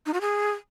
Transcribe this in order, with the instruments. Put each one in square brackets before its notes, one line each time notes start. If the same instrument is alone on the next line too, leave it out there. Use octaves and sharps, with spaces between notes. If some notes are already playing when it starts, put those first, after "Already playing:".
[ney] D#4
F#4
G#4